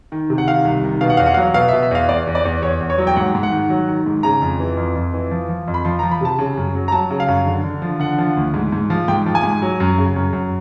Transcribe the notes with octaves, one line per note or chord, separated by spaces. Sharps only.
D#3
C3
F#5
D#3 F5
C2
D#3
B2 F5
F#5
E2 F5
F#5
F5
F#3
B2 F5
E5
B2
E5
E2 F5
E2 D5
E2
D5
E2
E2 C#5
E2
C#5
F#3
G5
G#2 F#5
G#2
F#5
D#3
F#3
D#3
G#2
C#3 A#5
F2
E3
F2
F2
E3
F3
F3
F2
B5
F3 C6
A#5
F3
B5
C3 A5
C#3
F#2
F#3
A#5
F#3 A5
C#3
F5
F#2
D3
D3
F3
D3 F#5
F3
D2
G#2
G#2
F3
G#2 G5
F3
G#5
G#2
F#3
F#2
C#3
F#2
F#2